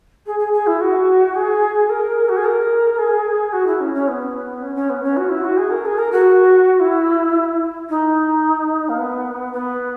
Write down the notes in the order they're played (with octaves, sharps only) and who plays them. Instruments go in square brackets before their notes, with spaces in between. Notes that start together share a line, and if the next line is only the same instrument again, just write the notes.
[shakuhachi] G#4
G#4
G#4
E4
F#4
G#4
A#4
F#4
G#4
A#4
G#4
F#4
E4
C#4
C#4
B3
C#4
C#4
B3
C#4
F#4
E4
F#4
G#4
A#4
G#4
A#4
F#4
E4
D#4
A#3
B3
B3